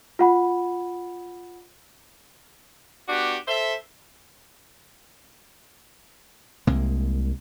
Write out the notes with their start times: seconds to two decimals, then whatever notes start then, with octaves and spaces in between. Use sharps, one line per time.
0.19 F4 F#5 B5
3.08 B3 D4 F#4 G4
3.48 A4 C5 E5
6.67 C2 C3 G#3 A#3